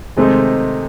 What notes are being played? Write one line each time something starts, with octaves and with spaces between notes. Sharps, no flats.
C3 D#3 G#3 A3 C4 D#4